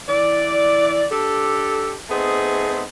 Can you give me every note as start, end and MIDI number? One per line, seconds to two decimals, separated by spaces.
0.08 1.04 52
0.08 1.04 74
1.11 1.94 62
1.11 1.94 67
1.11 1.94 69
2.09 2.82 57
2.09 2.82 59
2.09 2.82 60
2.09 2.82 63
2.09 2.82 68